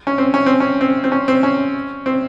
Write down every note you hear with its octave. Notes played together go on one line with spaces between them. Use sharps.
C#4
C4
C#4
C4
C#4
C4
C4
C#4
C4
C#4
C4